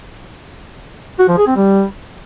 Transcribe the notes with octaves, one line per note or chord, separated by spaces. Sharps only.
F#4
F3
G#4
C4
G3